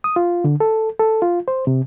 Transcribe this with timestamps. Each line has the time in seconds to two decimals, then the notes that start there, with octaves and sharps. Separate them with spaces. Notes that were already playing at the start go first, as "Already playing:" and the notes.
0.04 D#6
0.16 F4
0.44 D3
0.60 A4
0.99 A4
1.22 F4
1.48 C5
1.67 C3